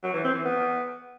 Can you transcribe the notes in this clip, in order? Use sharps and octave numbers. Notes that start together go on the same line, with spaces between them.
F#3
E3
C4
E3
B3